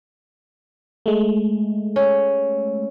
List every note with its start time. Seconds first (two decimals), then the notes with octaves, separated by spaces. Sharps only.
1.06 G#3 A3
1.96 C#4